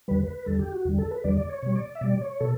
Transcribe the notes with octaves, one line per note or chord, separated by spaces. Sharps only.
E2 D3 G3 B4
B4
E2 D3 G3 A4
G4
F#4
E2 D3 G3
A4
B4
E2 D3 G3 D5
D5
C#5
B2 G3 C#5
D5
E5
B2 G3 D5
C#5
B2 A4